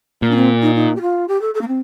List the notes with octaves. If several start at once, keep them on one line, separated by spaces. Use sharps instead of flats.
A#2 A#3
D4
C4
D#4
D#4
G4
F4
G4
A4
A4
A#3
C4